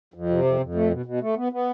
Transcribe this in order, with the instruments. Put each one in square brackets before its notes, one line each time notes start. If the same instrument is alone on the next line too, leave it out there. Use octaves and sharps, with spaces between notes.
[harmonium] F2
C3
F2
F2
A3
B2
B2
A3
B3
B3